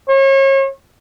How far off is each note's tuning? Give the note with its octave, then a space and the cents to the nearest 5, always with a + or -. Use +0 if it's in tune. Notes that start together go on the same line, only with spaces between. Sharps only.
C#5 -35